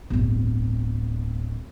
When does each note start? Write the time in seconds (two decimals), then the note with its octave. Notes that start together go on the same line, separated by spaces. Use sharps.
0.10 D1 G1